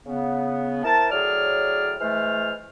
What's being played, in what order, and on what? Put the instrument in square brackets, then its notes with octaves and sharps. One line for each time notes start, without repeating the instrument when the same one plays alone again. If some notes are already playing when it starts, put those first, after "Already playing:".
[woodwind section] C#3 B3
E4 A#4 C5 A5
A2 F#3 G#4 D5 F6
E3 G#3 A3 C5 F6